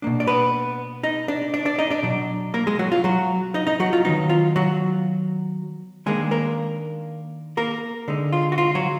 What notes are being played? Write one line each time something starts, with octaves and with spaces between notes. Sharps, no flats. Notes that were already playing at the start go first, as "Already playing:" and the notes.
B2 A#3 D4
D5
B3 B4
D#4 D#5
D4 D5
D4 D5
D4 D5
D#4 D#5
D4 D5
B2 F#3 D4
A#3 A#4
G#3 G#4
F#3 F#4
F4
F#3 F#4
D#4 D#5
D#4 D#5
F#3 F#4
F4
D#3 F#3 B3 D#4
F4
F#3 F#4
D#3 G#3 A#3 D4 G#4
A#3 A#4
A#3 A#4
D3 G#3 D#4
F4
F#4
F4
F#3 F#4